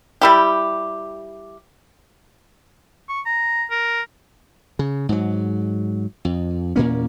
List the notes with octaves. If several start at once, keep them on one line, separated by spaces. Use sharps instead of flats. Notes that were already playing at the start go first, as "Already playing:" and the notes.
G3 E4 G4
C#6
A#5
A#4
C#3
G#2 F#3
F2
E2 A#2 A#3 C#4